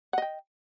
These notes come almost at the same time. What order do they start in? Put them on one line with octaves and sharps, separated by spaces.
F#5 D#5 G5